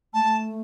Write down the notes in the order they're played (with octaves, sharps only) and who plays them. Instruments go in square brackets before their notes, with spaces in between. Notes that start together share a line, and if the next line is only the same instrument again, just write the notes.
[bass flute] A3 [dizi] A5